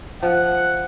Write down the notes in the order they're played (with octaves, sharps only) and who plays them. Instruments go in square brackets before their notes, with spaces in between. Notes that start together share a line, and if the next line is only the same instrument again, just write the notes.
[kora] F3 [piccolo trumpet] F#5